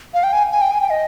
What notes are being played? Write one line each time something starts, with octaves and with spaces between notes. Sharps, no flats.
F5
G5
G#5
G#5
G5
G#5
G5
D#5